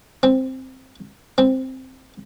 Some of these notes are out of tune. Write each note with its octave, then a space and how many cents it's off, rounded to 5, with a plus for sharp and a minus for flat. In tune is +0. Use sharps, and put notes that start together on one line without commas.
C4 +0
C4 +0